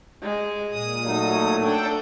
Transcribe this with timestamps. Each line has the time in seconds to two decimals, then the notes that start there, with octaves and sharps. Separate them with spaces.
0.23 G#3
0.70 A#2 D#6
1.05 F#3 A3 D#4
1.62 D4 A4 G5